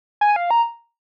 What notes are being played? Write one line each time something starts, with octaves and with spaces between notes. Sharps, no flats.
G#5
F5
A#5